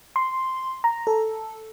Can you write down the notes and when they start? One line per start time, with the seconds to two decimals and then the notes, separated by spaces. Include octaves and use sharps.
0.16 C6
0.84 A#5
1.07 A4